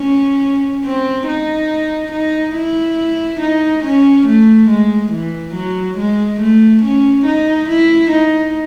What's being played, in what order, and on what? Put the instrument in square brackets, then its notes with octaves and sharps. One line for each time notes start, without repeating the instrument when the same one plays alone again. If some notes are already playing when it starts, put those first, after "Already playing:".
Already playing: [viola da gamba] C#4
C4
D#4
D#4
E4
D#4
C#4
A3
G#3
E3
F#3
G#3
A3
C#4
D#4
E4
D#4